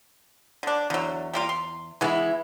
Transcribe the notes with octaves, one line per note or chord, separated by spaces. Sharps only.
D3 D4
E2 D3 F#3
G3 A#3 F4
C6
E3 G#3 B3 E4 G#4